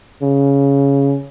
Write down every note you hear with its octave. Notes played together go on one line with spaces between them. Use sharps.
C#3